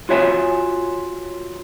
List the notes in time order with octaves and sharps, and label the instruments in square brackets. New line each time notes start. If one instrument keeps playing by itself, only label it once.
[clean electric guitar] F4 F#4 C#5 E5 G#5